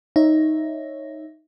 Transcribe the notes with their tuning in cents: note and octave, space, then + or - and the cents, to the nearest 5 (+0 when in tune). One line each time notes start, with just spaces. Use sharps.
D#4 +5 C#5 -10 E5 +0